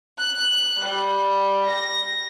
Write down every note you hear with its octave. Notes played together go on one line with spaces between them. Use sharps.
F#6
G3
A#6